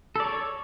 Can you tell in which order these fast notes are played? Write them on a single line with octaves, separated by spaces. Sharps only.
A4 D5 C#5